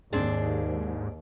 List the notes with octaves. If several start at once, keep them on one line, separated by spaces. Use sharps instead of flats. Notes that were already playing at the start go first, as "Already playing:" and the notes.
D#2 G#2 C4 D4 G#4